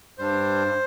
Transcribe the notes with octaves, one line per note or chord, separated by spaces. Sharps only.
G2 G3 D4 C5